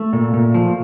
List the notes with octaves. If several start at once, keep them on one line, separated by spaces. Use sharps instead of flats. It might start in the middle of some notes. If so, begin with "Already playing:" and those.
Already playing: A3
A#2
A#2
F3